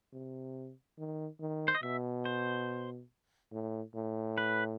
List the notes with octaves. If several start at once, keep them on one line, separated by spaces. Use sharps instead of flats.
C3
D#3
D#3
C5
D#5
B2 E5
C5
A2
A2
B4